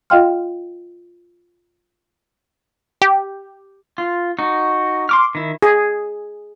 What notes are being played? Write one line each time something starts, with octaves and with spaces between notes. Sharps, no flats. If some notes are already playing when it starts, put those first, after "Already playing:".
F4 D#5 F5 G5 C6 F6
G4
F4
D#4 F#4
C6 D6 F6
D#3 E4
G#4